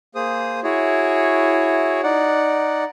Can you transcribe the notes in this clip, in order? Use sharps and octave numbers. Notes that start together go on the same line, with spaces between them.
A#3 G#4 C5 D#6
E4 F#4 G#4 C#5
D#4 D5 F#5